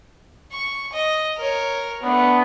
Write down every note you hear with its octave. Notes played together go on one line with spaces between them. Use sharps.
C#6
D#5
A#4 C#5
A3 B3 D4